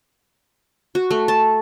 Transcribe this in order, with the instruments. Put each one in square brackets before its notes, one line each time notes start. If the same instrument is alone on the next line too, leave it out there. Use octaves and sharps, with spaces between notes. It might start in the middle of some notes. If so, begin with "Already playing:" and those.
[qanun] F#4
A3
A5